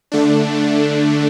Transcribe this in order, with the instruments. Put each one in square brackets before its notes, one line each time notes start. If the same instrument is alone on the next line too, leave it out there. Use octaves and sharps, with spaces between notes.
[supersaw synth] D3 A3 D4